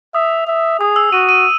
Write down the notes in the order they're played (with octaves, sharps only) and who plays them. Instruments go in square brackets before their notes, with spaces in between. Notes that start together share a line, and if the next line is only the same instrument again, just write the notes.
[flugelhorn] E5 [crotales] D#6
[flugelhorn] E5
[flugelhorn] G#4 [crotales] D#6
[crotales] E6
[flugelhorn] F#4 [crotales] D#7
[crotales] D#7